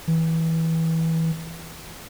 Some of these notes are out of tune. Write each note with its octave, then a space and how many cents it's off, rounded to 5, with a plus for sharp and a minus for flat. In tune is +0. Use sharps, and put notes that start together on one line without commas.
E3 -20